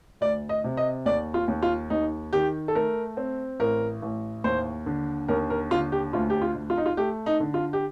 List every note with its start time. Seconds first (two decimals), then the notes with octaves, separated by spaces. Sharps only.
0.21 D2 D5
0.49 D#5
0.64 C3
0.77 D#5
1.06 D#2 D5
1.34 F4
1.48 D#2
1.62 F4
1.90 D#2 D#4
2.33 D#3 G4
2.68 A4
2.75 A3 A#4
3.17 C4
3.60 A1 A#4
4.02 A1
4.44 D#2 C5
4.86 D3
5.28 D#2 A#4
5.50 A#4
5.71 D3 F4
5.92 G4
6.13 D2 F4
6.30 G4
6.42 F4
6.55 D2
6.70 F4
6.77 D#4
6.86 F4
6.97 A3 G4
7.26 D#4
7.40 D3
7.54 F4
7.73 G4